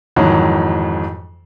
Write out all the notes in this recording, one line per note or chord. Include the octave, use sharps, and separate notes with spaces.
F2 G#2 D#3 E3 F#3